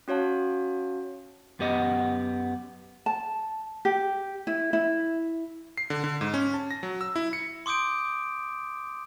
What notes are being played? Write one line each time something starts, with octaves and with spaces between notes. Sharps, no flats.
C#4 F#4 C#5 F5 A5
F#2 B3 G4 D#5 F#5
A5
G4
E4
E4
C7
D3
D3
G#2
C#4
A5
A#6
F#3
E6
E4
C#7
C6 D6 D#6 G6 D7